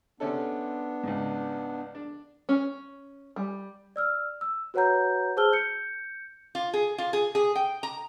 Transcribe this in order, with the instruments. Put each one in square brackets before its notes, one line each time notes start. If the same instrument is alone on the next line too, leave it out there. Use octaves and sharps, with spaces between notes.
[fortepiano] C3 C#4 A4 [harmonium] B3 D4
[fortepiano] C#2 G#2
D4
[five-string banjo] C#4
G3
[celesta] D5 E6 F6
E6
F#4 B4 C#5 F#5 A#5 G6
G#4 C5 A5 E6 F6 G7
G6 C#7
[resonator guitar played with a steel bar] F4
G#4
F4
G#4
G#4
G5
A#5